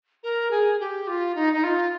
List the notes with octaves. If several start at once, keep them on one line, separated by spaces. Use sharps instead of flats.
A#4
G#4
G4
F4
D#4
D#4
F4